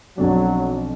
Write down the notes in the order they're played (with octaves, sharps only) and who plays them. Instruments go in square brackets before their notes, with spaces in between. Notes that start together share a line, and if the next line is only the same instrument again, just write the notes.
[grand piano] B1 F2 D4 [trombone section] F#3